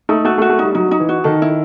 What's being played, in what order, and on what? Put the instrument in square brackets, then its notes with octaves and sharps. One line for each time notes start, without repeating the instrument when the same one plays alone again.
[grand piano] A3 [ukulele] D#4
[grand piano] A3 [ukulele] F#4
[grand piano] A3
[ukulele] F#4
[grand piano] A3
[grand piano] G3 [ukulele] D#4
[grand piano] F#3 [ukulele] D#4
[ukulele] D#4
[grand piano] E3
[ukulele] F#4
[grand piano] D#3 [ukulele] A4
[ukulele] E4